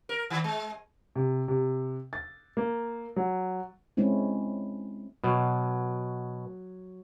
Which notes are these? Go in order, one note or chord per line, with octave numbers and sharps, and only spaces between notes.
A#4
D#3
G#3
C3
C3
A6
A#3
F#3
G#3 C4 C#4 E4
B2 F#3